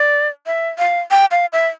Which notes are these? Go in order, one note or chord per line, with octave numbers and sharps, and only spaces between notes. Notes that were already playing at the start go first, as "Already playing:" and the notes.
Already playing: D5
E5
F5
G5
F5
E5